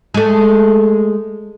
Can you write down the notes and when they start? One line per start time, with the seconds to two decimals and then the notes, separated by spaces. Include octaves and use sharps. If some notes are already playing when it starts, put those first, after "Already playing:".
0.14 G#3 A3